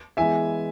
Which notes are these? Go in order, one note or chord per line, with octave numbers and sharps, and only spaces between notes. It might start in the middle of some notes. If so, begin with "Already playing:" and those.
E3 G#3 B3 E5 G#5